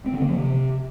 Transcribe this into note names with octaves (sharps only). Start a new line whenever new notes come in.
C4
D3
A#3
F3
C3